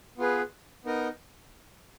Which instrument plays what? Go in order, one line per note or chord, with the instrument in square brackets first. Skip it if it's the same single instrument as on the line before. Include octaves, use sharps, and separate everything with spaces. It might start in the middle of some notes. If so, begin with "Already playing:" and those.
[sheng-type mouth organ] B3 F4 G#4 B4
B3 D#4 A#4 D#5